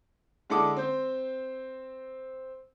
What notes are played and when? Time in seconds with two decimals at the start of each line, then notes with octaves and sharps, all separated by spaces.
0.50 D3 G#3 E4 A4 D6 D#6
0.77 C4 C5